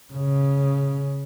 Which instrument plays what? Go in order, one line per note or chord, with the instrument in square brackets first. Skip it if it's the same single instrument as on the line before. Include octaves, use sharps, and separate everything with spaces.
[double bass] C#3